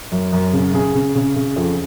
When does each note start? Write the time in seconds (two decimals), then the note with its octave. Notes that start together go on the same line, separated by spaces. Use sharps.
0.12 F#2
0.33 F#2
0.53 C#3
0.74 C#3 G#4
0.95 C#3
1.15 C#3
1.36 C#3
1.56 F2